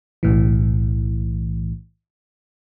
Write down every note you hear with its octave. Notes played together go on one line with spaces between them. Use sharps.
B1 A2 E3